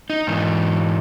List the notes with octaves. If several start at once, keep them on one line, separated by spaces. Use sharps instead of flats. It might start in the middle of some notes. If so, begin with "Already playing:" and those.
D#4
G#2 E3